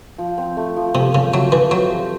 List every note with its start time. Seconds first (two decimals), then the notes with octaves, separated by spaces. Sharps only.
0.18 F3
0.38 C4
0.57 A3
0.77 F3
0.95 C3 F3
1.14 C#3 C4
1.33 F#3 A3
1.52 E3 F3
1.71 F#3 C5
1.90 G4